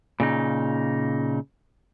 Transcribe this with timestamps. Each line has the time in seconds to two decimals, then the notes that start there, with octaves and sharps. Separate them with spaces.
0.20 A#2 C#3 D#4